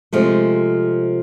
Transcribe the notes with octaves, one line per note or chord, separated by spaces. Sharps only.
C3 F3 G#3 A3